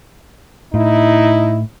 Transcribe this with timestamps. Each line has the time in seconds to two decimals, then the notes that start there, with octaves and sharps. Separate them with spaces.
0.74 A2 D#4 E4